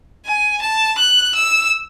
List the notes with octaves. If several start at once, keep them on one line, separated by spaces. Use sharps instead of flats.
G#5
A5
F#6
E6